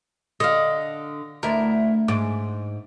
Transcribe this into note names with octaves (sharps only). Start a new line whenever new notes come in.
D3 D#5 F5
D2 E4 A#4
G#2 D6